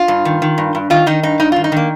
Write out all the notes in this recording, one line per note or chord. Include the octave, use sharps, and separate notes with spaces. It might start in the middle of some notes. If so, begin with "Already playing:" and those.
Already playing: F4
G2
D#3
D#3
G2
G2
D#3 F4
D#3 D#4
G2 D#4
G2 D#4
D#3 F4
D#4
D#3 A#3